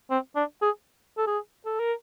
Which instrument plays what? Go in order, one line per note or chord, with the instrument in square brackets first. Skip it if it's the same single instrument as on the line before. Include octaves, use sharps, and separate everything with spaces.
[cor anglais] C4
D4
G#4
A4
G#4
A4
A#4